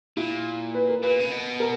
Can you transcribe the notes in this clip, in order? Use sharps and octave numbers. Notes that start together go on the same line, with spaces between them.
A#2 E4
B4
A#4
A#2 B4
C#3
B2
A#4